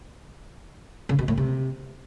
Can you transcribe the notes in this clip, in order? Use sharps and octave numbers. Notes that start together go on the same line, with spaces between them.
C#3
B2
A2
C3